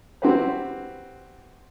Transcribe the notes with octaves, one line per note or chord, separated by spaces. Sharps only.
C4 E4 F#4 G4 B4 C5